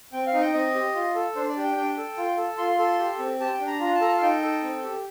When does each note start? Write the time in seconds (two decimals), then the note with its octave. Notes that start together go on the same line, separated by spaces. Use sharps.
0.13 C4 G5
0.27 F5
0.34 D#4
0.41 G5
0.54 C4 D#5
0.75 G4
0.95 F4
1.15 A4
1.36 D4 C5
1.49 D5
1.57 G4
1.64 G5
1.76 D4 G5
1.97 A4
2.17 F4
2.37 A4
2.58 F4 C6
2.78 A4
2.99 G4
3.19 C4
3.41 G4 A5
3.53 G5
3.60 D4
3.67 A#5
3.81 F4 A#5
3.95 A5
4.01 A4 A#5
4.08 A5
4.17 F5
4.22 D#4 G5
4.43 A4
4.63 C4
4.83 G4